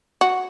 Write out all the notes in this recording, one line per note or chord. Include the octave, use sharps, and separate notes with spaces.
F#4